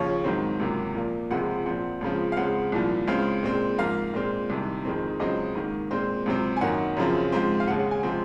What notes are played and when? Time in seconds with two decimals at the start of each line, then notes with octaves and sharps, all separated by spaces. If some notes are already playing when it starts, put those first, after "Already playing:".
Already playing: D#2 C#3 F3 C#5
0.24 G#2 D#3 F#3 C4
0.60 C#2 C3 F#3 A#3
0.95 A#2 F3 A#3
1.31 C#2 C3 F3 G#3 C4 F#5
1.66 A#2 F3 C4 F#5
2.01 C#2 C#3 F3 C4
2.32 F5
2.37 C#2 C#3 G#3 C4 F#5
2.72 C2 A#2 F3
3.08 C#2 C#3 G#3 C4 F5
3.43 A#2 G#3 C4
3.78 G#2 F3 A#3 F5
4.14 A#2 G#3 C4
4.50 C2 C3 D#3
4.85 F2 D#3 G#3 C4
5.20 C#2 C#3 F#3 C4 D#5
5.55 G#2 D#3 A#3
5.91 A#2 G#3 C4 C5
6.26 C#2 C3 F#3 C4
6.57 G#5
6.61 F#2 D#3 A#3 F#5
6.97 F#2 C#3 F3 C4
7.32 G#2 F3 G#3 C4
7.60 F5
7.67 D#2 C#3 G#3 F#5
7.79 F#5
7.91 G#5
8.03 C3 F3 G#3 C4